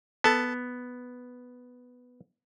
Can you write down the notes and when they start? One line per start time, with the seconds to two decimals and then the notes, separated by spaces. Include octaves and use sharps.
0.24 B3 A4 A5